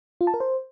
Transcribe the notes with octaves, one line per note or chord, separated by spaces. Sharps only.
F4
A5
A#4
C5